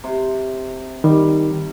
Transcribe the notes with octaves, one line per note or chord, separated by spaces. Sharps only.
C3
D#3 G3